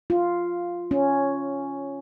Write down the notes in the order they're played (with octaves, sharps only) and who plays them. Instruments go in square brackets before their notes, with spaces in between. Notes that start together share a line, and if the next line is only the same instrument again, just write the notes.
[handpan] F4
C#4